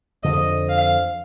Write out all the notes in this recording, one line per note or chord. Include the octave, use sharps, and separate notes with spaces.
F2 D3 F3 D#5
F5